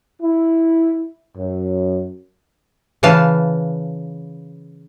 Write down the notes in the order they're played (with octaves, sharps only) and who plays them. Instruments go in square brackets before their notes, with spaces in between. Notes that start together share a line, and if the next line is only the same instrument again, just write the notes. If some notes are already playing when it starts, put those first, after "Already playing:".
[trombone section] E4
F#2
[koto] C#3 E3 B4 F5 A5